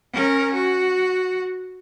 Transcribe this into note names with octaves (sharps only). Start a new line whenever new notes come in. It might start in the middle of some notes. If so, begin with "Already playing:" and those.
C#4 A#4
F#4